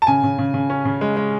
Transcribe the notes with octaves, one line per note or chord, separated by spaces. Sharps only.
A5
C#3 G#5
C#3
C#3
C#3
C#4
C#3
G#3
G#3